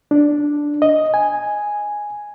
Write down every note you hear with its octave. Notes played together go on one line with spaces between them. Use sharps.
D4
D#5
G#5